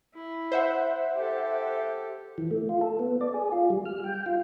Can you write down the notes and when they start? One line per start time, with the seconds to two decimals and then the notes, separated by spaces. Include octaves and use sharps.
0.14 E4
0.52 C5 E5 F#5
1.15 G4 A4
2.38 E3
2.51 A3
2.69 F4
2.81 A4
2.99 B3
3.21 D5
3.34 G#4
3.52 F4
3.70 G3
3.85 F6
4.04 G5
4.26 F4